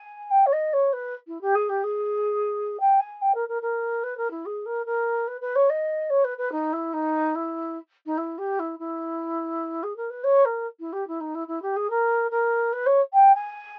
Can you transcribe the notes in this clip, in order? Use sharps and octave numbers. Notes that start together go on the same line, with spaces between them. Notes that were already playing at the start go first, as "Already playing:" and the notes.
Already playing: G#5
G5
C#5
D#5
C#5
B4
E4
G4
G#4
G4
G#4
G5
G#5
G5
A#4
A#4
A#4
B4
A#4
E4
G#4
A#4
A#4
B4
B4
C#5
D#5
C#5
B4
B4
D#4
E4
D#4
E4
D#4
E4
G4
E4
E4
G#4
A#4
B4
C#5
A#4
E4
G4
E4
D#4
E4
E4
G4
G#4
A#4
A#4
B4
C#5
G5
G#5